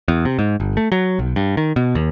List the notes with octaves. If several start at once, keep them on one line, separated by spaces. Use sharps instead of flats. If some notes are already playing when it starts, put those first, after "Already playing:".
E2
C3
G#2
G1
A3
F#3
B1
G2
D#3
B2
D#2